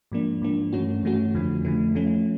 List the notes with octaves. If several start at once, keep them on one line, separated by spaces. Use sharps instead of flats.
G#2 F3 A#3 D4
G#2 F3 A#3 D4
G2 E3 A3 C#4 F#4
G2 E3 A3 C#4 F#4
F2 D3 F3 A3
F2 D3 F3 A3
F3 A3 C#4